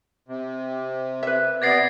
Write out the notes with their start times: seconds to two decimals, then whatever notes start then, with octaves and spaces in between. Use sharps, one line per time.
0.28 C3
1.23 B4 E5
1.62 C3 B3 D5 G#6 A#6 C7